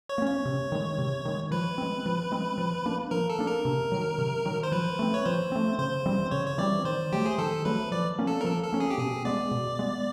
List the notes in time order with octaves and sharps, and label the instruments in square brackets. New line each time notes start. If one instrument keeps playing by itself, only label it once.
[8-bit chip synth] C#5
[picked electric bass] A#3
C#4
[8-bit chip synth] C#5
[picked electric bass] C3
D#3 G#3
C3
D#3 G#3
[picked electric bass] F3 [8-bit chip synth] B4
[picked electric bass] G#3 C4
F3
G#3 C4
F3
A#3 D4
[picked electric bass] F3 [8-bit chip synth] A#4
[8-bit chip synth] A4
[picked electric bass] A#3 D4
[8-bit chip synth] A#4
[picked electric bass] C3
D#3 F#3
C3
D#3 F#3
[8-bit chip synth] C5
[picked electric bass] F3 [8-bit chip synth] B4
[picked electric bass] A3 C4
[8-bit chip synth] C#5
[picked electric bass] F3 [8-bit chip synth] C5
[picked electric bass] A3 C4
[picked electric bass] C#3 [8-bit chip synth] C5
[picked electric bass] E3 G3 C4
[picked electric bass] C#3 [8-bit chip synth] C#5
[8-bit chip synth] C#5
[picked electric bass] E3 G3 C4 [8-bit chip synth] D5
[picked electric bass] D#3 [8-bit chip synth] C5
[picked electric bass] F#3 A3 [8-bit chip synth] G4
[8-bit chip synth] G#4
[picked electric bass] D#3 [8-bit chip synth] A4
[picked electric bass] F#3 A3 [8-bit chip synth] B4
[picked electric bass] F3 [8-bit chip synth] D5
[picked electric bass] A#3 C#4
[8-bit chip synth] A4
A#4
[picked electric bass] F3 [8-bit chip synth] A4
[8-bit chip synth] A4
[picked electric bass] A#3 C#4
[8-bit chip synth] G#4
G4
[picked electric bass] B2 [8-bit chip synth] G#4
[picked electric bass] G#3 B3 [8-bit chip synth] D5
[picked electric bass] B2
G#3 B3